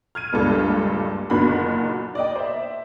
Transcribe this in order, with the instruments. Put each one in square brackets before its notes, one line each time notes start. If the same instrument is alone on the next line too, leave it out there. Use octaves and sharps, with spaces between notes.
[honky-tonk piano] F6 G#6 D#7
F#1 C#2 G2 A#2 D4 A4
F#1 A#2 D3 D#3 F#4 B5
D5 D#5 G5
C5 E5